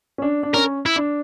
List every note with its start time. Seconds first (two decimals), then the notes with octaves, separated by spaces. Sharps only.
0.18 C#4
0.22 D4
0.43 D4
0.54 C#4 A#4
0.86 E4
0.96 D4